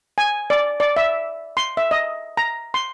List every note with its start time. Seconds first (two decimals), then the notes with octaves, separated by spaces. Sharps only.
0.18 G#5
0.50 D5
0.80 D5
0.97 E5
1.57 C6
1.77 E5
1.91 D#5
2.37 A#5
2.74 C6